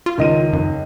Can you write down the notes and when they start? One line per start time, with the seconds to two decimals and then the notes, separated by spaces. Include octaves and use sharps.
0.06 F4
0.18 C#2 D#3 D#5 D#7
0.53 F#2